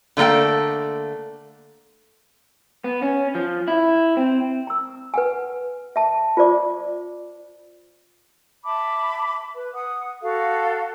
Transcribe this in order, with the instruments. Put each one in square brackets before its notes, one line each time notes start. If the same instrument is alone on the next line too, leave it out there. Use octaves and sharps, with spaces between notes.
[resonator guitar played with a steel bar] D3 A3 A#3 A4 G5
[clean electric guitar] B3
C#4
F3
E4
C4
[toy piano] A#5 E6
B4 F#5 G#5
E5 A5
F4 C5 D5 D6
[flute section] E5 A5 B5 D6
B4
F#5 D#6
F#4 A4 F5